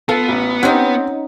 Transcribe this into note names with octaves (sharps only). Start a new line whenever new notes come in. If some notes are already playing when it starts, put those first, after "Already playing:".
B3 F4 A4
A1
C4 C#4 D#4 G4 F#5